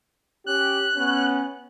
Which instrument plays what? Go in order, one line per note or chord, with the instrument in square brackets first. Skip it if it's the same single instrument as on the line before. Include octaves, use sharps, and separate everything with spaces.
[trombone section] C#4 G4 [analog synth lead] F#6
[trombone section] B3 C#4